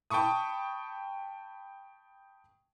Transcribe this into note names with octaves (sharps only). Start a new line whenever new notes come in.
G5 A5 B5 C#6 D#6